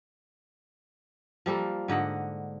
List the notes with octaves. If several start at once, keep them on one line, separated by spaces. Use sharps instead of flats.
F3 G3 A#3 A4
G#2 D3 D#5 F#5